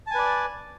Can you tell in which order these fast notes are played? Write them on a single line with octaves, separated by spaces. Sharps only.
A5 G#5 B4 D5